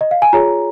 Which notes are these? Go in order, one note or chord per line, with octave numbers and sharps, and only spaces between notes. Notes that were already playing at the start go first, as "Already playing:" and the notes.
D#5
F5
G#5
F4 G#4 C#5 A#5